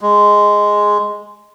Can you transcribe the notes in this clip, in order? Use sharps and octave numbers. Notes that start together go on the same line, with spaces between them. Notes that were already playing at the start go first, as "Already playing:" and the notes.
G#3